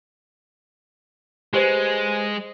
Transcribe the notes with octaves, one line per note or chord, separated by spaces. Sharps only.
G#3 G4 B4 C5